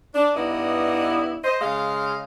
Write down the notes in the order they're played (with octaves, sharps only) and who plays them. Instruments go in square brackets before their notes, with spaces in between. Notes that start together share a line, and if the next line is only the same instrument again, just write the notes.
[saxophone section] D4
G2 B3 D#4 E4 D5 D#5
C5 D#5
C#3 G#3 D#5 F5